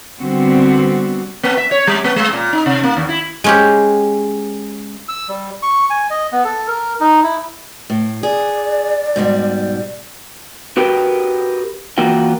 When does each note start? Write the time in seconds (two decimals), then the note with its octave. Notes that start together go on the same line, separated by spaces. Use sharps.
0.20 D3 G3 B3 C4 F#4
1.43 A#3
1.57 E5
1.71 C#5
1.87 G3
2.04 A#3
2.16 G#3
2.33 A#2
2.53 D#4
2.66 C3
2.83 A#3
2.97 D#2
3.09 E4
3.44 G#3 C#4 G4
5.08 E6
5.29 G3
5.62 C#6
5.90 G#5
6.10 D#5
6.32 B3
6.45 A4
6.67 A#4
7.00 D#4
7.24 E4
7.90 A2
8.23 G#4 D5
9.16 G#2 B2 G3
10.77 F#4 G4 A#4 B4 G5
11.98 E3 A#3 F4 F#4 G5